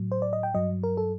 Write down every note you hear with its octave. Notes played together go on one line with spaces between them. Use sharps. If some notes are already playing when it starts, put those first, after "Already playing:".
Already playing: A2 F#3
C5
D5
D#5
G5
G2 F#3 D#5
A#4
A4